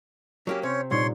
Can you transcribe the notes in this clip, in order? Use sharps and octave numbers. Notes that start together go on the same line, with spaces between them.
F#3 A#3 C#4 G4
C3 C#4 C5 C#5
A#2 G3 D#4 C#5 C6